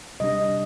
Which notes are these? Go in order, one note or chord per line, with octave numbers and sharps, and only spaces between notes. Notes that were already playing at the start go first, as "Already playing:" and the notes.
C3 G3 D4 D#5